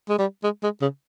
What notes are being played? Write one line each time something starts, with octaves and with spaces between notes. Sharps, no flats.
G#3
G3
G#3
G#3
C#3